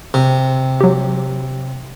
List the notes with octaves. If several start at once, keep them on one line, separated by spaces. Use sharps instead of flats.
C3
F#3 G4